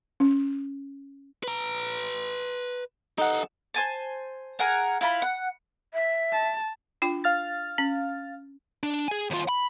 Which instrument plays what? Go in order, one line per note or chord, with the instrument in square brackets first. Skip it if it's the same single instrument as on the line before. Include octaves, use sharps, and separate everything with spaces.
[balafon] C#4
[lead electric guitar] B4 A#5
[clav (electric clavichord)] D#4 F#5 [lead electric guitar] G4 A4
[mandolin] C5 G#5 A5
G#4 A#4 F#5 G#5
E4 F4 B4 B5
F#5
[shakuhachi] E5
[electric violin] A5
[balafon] D4 F4 G5
[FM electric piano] F5 F6 A6
[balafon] C#4
[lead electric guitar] D4
G#4 G#5
D#2 F4
B5